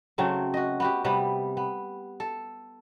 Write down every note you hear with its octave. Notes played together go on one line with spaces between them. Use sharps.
C#3 F#3 A3 C4
F#4 D#5
B3 F#4 G4
C3 G3 B3 B4
B3
A4